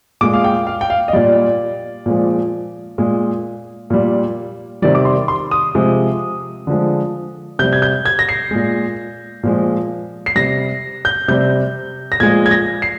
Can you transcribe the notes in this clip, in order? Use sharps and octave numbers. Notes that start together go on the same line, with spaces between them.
A#2 G#3 D6
F5
G5
F5
G5
F5
D#5
A#2 G3 D5
A#2 F3 G#3
A#2 G#3
A#2 G3
C3 D#3 G3 D5
D6
C6
C6
D#6
C3 F3 G#3
D3 F3 G#3
C3 G3 G6
G#6
G6
G#6
A#6
C7
A#2 G#3
A#2 F3 G#3
C7
C3 G3 A#6
G6
C3 G3 G6
A#6
A#2 F3 G#3 G#6
G#6
A#6
C7